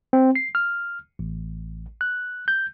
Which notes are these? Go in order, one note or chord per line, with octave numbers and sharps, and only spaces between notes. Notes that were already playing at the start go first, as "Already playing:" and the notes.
C4
C7
F6
A1
F#6
G6